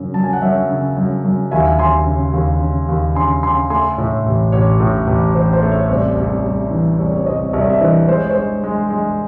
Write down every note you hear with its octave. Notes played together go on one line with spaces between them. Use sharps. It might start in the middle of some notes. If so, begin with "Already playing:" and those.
Already playing: F#2 C#3
F#2 A5
G#5
F#5
F#2 C#5 E5
C#3
F#2
F#2
D#2 E5 G#5
D#2 G#5 C6
C#3
D#2
C#3
D#2
C#3 G#5 C6
C#3 G#5 C6
A3 G#5 C6
A2 C#5 E5
A1
A1 C#5
A2
A1
A1 C5
C5
A3
C#5
C2 C5
C2
C2
E3
C2 C#5
C#5
C2 C5 D#5
D#5
C2 C#5 E5
E5
E3 C5 D#5
G#3 C5
C#5
G#3 C5
G#3
G#3